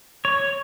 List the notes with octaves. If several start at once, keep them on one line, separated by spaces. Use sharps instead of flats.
C#5